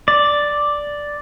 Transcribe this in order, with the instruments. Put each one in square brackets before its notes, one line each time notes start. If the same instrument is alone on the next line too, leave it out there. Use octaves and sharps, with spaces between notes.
[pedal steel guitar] D5